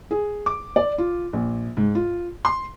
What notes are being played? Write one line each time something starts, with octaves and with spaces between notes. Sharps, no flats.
G#4
D6
D5
F4
A#1
G#2
F4
C6